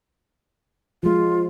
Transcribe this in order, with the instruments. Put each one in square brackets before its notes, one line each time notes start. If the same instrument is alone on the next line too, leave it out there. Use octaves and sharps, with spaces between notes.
[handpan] F3 G#3 [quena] F4